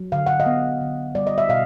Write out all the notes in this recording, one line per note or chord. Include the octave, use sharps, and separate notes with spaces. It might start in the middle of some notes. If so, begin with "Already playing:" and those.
Already playing: F#3
D3 F5
F#5
D#5 F5
B3
D3
G3 D5
D#5
E5
B2 D#5 F5